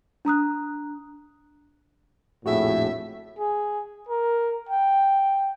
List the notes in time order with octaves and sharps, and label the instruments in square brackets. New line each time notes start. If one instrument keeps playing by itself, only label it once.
[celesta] D4 A#5 D#6 F#6
[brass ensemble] A#1 F2 A2 [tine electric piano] F#4 G#4 [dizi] E5
[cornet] G#4
A#4
G5